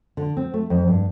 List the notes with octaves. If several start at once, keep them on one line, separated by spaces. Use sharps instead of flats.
D3
C4
A3
F2
G2